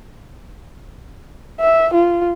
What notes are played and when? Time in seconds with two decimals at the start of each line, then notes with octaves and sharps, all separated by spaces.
1.60 E5
1.94 F4